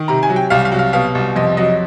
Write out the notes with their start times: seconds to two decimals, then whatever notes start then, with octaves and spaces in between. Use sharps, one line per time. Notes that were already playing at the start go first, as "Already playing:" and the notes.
Already playing: D#3
0.08 C3 A#5
0.23 G#5
0.30 F#3
0.36 G5
0.50 C2 F5
0.65 F5
0.72 F#3
0.79 F5
0.93 B2 F5
1.15 C2
1.36 F2 D#5
1.57 F#3 D#5